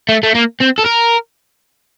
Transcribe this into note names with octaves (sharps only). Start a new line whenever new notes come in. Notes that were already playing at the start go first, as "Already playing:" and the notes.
A3
A3
A#3
C4
A4
A#4